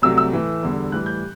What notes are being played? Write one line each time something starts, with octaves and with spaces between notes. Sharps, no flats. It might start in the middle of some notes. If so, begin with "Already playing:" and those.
C2 C3 F#3 A3 E6
E6
A2 E3 A3
E2 D3 G3
A2 E3 G3 F#6
G6